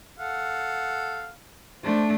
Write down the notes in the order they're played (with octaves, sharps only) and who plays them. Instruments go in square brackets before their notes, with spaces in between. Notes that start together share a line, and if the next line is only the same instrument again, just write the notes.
[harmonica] A4 F5 F#5
[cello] A3 D4 [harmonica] C5